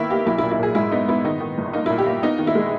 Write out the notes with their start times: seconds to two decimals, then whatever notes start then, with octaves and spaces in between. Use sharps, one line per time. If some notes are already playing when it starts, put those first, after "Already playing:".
Already playing: D#3 A#3 B3 E4
0.10 A#3 G4
0.26 B1 E4
0.38 E4
0.43 A#2
0.51 E4
0.59 A#2 G#4
0.75 G#2 E4
0.91 B3 D#4
1.08 B3 E4
1.25 D#3 D#4
1.40 D#3
1.58 G1
1.73 A#3 D#4
1.86 A#2 E4
1.98 G4
2.06 A#3
2.23 B3 D#4
2.39 D#3
2.47 E4
2.55 G#3